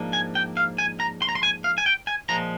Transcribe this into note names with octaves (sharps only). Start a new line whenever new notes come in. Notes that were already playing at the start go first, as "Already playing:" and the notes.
Already playing: G#2 F3 A#3 D4
G#5
G5
F5
G#5
A#5
C6
A#5
C6
G#5
F5
G#5
G5
G#5
A#2 F3 G#3 A#5